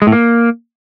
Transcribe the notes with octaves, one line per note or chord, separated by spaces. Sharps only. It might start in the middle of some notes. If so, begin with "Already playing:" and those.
G#3
A2
A#3